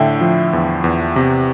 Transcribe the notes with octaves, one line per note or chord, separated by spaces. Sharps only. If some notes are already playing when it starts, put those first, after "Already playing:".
Already playing: A2 D3 E5 G5
F3
E2
E2
C3